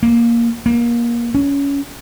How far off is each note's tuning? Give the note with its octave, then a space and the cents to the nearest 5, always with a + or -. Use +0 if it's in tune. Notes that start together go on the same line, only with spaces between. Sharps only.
A#3 +5
A#3 +25
C#4 +20